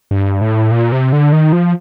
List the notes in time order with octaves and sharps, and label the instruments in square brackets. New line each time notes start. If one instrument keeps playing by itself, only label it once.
[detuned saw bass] G2
A2
A#2
C3
D3
D#3
F3